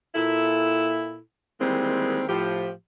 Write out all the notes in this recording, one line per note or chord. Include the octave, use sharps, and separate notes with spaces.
A#2 E4 A4
D#3 E3 G3 G#3 A#3 C4
A2 F3 G4